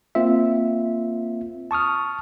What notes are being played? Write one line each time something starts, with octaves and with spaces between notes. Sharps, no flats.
A#3 C4 F4 E5
A5 C#6 D#6 F6